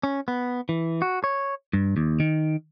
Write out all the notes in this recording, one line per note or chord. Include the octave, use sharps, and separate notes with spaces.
C#4
B3
E3
F#4
C#5
G2
D#2
D#3